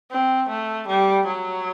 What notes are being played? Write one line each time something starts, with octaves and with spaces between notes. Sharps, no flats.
C4
A3
G3
F#3